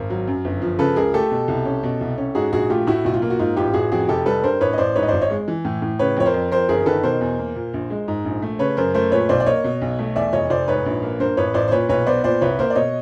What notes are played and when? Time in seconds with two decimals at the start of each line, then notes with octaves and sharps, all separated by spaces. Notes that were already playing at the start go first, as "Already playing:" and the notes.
Already playing: G#1 A#4
0.10 F#3
0.28 F#2
0.45 G1
0.62 F3
0.79 C#3 A4 B4
0.96 C#2 G#4 A#4
1.14 A3 G4 A4
1.31 B2
1.48 C2
1.66 C#4
1.83 B2
2.01 C2
2.18 C#4
2.35 G#2 F#4 G#4
2.52 A#1 F#4 G#4
2.70 A3 F4 G4
2.87 A2 E4 F#4
3.04 B1 F#4
3.14 F4
3.22 A#3
3.30 F#4
3.39 G#2 F4
3.56 A1 F4 G4
3.74 A1 F#4 G#4
3.92 F2 F#4 G#4
4.09 F1 G4 A4
4.26 G3 A4 B4
4.44 G2 A#4 C5
4.61 A1 B4 C#5
4.73 D#5
4.78 A1 C5 D5
4.95 G#2 B4 C#5
5.03 D#5
5.08 G#1 C5 D5
5.21 C#5 D#5
5.30 G#3
5.48 E3
5.65 A2
5.82 A2
5.99 C#3 B4 C#5
6.17 F2 C#5
6.26 A#4 C5
6.34 F2
6.52 F2 A#4 C5
6.69 G1 G#4 A#4
6.86 D#3 A4 B4
7.03 B2 A#4 C5
7.21 E2
7.39 A#3
7.55 A#2
7.74 A#1
7.90 G#3
8.08 G#2
8.25 A#1
8.42 A3
8.59 C#3 B4 C#5
8.77 F#2 A#4 C5
8.94 A3 A#4 C5
9.12 A#2 B4 C#5
9.29 B1 C5 D5
9.40 D5
9.46 A#3 C#5 D#5
9.64 B2
9.82 B1
9.99 A3
10.16 E2 D5 E5
10.33 F1 C#5 D#5
10.50 F1 C5 D5
10.68 G#2 B4 C#5
10.86 A#1
11.03 A#3
11.20 G2 A#4 C5
11.37 A1 B4 C#5
11.54 A1 C5 D5
11.68 C5
11.72 A#2 B4 C#5
11.89 B1 B4 C#5
12.06 B3 C5 D5
12.24 A#2 C5 D5
12.41 C2 B4 C#5
12.59 A#3 A#4 C5
12.70 D5
12.75 B2 C#5 D#5